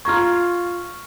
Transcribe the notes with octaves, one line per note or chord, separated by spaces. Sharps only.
F4 A#5 C#6 F6 G#6